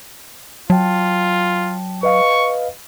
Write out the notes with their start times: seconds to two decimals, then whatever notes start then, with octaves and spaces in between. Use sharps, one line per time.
0.70 F#3 F4 G5 A5
2.03 B4 D#5 F5 C#6